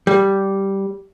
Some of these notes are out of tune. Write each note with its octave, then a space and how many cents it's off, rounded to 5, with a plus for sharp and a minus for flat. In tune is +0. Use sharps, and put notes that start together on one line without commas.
G3 -5